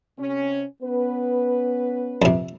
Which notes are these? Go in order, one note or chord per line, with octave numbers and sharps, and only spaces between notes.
C3 C#4
B3 C#4 B4
F2 C3